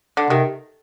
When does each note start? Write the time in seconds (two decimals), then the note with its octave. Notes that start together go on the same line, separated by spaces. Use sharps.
0.17 D3
0.30 C3 D#3